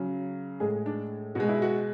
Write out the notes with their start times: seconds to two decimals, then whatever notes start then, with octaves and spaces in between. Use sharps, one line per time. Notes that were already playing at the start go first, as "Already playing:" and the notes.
Already playing: C#3 F#3
0.60 A2 G#3 G#4
0.86 D4
1.35 B2 G#3 F#4
1.49 E4
1.62 F#4